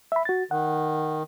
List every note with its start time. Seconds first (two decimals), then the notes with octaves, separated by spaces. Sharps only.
0.12 E5 B5
0.25 F#4 A6
0.51 D#3 F#5